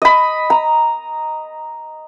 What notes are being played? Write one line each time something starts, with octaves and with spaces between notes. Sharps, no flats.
D#5 B5
A#5